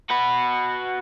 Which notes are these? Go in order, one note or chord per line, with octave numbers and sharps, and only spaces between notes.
F#4 B4